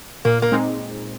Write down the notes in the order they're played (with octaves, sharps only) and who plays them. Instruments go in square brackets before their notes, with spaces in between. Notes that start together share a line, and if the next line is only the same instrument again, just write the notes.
[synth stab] A#2 [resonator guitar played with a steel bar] A#3
[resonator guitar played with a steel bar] A#3
[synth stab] G#3 C4 D#4